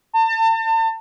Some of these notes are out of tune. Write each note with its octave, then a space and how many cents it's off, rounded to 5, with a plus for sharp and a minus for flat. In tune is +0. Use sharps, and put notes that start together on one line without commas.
A5 +35